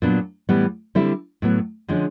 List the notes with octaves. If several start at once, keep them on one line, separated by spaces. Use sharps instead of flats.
A#2 F#3 B3 D4
A2 E3 G3 B3
D3 G3 C4 E4
A2 F#3 B3
D3 F3 G#3 C#4